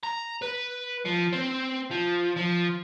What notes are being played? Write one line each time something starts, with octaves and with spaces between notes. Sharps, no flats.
A#5
B4
F3
C4
F3
F3